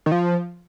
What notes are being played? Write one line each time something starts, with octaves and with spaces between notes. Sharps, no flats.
D#3
F3